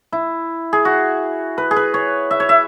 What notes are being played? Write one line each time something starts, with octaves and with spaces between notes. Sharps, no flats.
E4
G#4
F#4
B4
G#4
B4
C#5
E5
C#5
E5